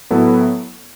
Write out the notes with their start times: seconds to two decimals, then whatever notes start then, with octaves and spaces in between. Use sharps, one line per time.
0.10 A2 F#3 B3 E4 A4